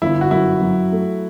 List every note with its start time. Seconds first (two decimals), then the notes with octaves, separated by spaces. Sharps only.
0.02 G1 E4
0.21 F#4
0.31 F#2 E4
0.61 F#3
0.92 A3